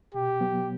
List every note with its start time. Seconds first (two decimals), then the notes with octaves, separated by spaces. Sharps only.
0.14 B2 G4
0.41 F#3 B3